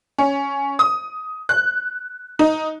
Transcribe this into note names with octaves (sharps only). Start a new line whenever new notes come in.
C#4
D#6
F#6
D#4